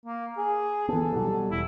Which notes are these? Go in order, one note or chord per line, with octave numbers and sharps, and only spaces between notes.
A#3
G#4
E3 B3 A4
B2 F#3 G3
E1 E4